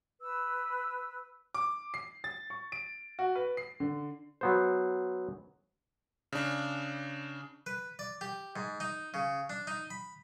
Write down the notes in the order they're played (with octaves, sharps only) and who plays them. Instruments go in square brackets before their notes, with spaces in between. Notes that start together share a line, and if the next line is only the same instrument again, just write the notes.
[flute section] B4 E6
[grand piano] D6
C7
A6
C#6
D7
F#4
B4
C7
D3
[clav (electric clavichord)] F#3 B3 C5
[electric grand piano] C#3 D4
[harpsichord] B4
D5
G4
G#2
D#4
C#3
D4
D#4
B5